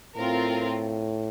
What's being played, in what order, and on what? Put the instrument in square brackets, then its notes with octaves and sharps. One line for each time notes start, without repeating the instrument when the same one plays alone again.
[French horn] A2 [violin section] C4 F4 A#4